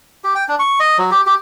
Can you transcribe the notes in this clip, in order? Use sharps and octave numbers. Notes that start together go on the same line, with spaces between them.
G4
G5
D4
C#6
D#5
F#3
G4
G4